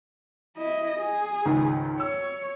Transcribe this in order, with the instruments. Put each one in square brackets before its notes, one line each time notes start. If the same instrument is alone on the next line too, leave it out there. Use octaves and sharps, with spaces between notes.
[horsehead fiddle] E4 D#5
G#4
[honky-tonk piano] C#2 G#2 D#3
[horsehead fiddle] C#5 [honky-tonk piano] E6